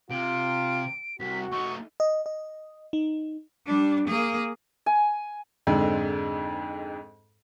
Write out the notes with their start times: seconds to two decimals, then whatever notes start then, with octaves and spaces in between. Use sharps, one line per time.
0.11 C3 F4 D7
1.20 C2 F#4 B6
1.52 A3 D#4 C#6
2.00 D#5
2.26 D#5
2.93 D#4
3.66 G3 D4
4.08 A#3 G#4
4.86 G#5
5.67 F2 G#2 D3 G#3